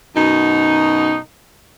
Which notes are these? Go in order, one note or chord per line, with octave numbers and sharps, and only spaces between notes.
F#2 B2 D#4